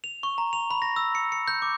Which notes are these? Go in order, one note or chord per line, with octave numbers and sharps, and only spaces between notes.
F7
C#6
A#5
F7
B5
A#6
E6
C#7
C#7
G6
D6